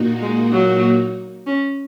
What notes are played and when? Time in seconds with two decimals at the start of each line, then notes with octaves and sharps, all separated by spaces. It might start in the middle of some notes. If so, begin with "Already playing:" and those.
Already playing: A#2 A#3 D#4 F#4
0.22 G#3
0.52 F#3
1.47 C#4